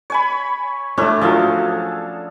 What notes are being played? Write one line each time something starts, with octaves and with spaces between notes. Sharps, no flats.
C#5 G#5 B5
A3 C#4 D4 E4 A4
F3 F#3 G#4 A4 F5